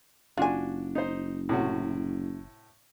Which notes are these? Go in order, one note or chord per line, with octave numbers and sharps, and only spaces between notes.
F#1 D4 F4 F#4 G#5
D#4 C5
A2 C3 F#4